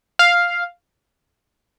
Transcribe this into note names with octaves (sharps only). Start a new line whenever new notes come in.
F5